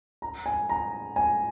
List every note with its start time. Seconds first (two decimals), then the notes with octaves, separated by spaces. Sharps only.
0.22 A#5
0.46 G#5
0.69 A#5
1.16 G#5